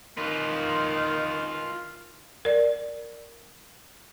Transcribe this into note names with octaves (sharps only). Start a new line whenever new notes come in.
D#3 F4 B4
A#4 D5